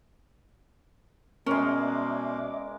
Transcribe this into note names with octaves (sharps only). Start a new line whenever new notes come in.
B2 G#3 C#4 A#4 D5 E5 D6